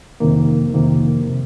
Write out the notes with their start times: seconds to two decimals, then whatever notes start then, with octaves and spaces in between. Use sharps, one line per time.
0.20 F2 C3 D#3 A#3
0.74 F2 C3 D#3 A#3
1.29 C3